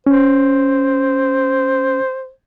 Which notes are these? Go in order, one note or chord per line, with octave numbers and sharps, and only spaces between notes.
C#4 C5